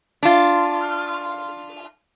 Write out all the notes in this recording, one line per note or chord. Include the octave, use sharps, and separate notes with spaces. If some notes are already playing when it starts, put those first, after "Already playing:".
D4 F4